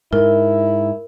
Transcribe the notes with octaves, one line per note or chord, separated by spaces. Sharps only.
G#2 E4 A#4